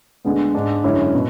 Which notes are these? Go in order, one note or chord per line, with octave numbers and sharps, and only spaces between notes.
D2 D3 G#3 B3
G#2 G#3 D4
F#2 D3 G#3 C#4 E4
B2